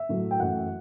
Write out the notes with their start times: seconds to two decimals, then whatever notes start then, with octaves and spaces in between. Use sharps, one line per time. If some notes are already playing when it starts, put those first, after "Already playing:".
Already playing: E5
0.09 A2 F#3 A3
0.31 G5
0.39 F#2 E3 A3 F#5